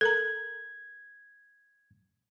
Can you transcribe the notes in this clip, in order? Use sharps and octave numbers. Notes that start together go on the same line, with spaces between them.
A4 A#4 A#5 G#6